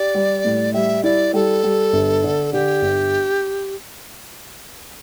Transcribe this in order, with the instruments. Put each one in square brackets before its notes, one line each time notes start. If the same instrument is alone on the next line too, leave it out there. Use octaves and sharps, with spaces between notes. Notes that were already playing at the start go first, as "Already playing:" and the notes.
Already playing: [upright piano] G4 [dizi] D5
[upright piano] G3
A2
[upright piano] G3 [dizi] E5
[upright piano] E4 [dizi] D5
[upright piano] G3 [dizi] A4
[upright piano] G3
G1
D3
[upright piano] D3 [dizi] G4
[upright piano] G1